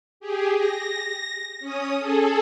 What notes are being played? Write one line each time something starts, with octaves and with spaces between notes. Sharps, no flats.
G4 G#4
A#6
C#4 D#6
G#4 A4